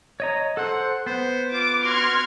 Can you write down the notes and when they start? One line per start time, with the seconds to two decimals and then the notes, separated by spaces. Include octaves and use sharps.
0.20 C#5 D#5 A#5
0.57 A4 C5 F#5
1.06 B3 C5
1.53 F4 D6
1.85 F#4 C6 F6 G#6